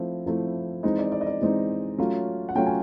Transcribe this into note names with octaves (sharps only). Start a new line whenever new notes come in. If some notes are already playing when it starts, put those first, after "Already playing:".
Already playing: F3 A3 C4 E4
F3 A3 C4 E4
E3 G#3 C4 D#4 D#5
D5
D5
D#5
D5
E3 G#3 C4 D#4
F#3 A3 C#4 F4
F#5
F#3 A3 C#4 F4 G5
G#5